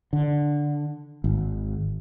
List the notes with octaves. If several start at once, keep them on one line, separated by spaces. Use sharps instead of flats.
D3
G#1